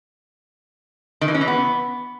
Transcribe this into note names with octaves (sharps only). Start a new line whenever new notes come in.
D#3
E3
C#4
E3
B3